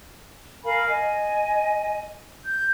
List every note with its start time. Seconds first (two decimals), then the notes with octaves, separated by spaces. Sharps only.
0.64 A#4 F5 G#5 B5
0.88 D#5 G#5
2.45 G6